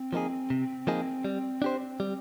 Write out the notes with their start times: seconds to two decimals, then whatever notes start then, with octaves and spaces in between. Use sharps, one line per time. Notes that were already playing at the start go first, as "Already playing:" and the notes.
Already playing: C4
0.13 F3 A#3 D#4 G#4
0.50 C3
0.87 F3 A#3 D#4 G#4
1.25 G3
1.62 D4 G4 C5
2.00 G3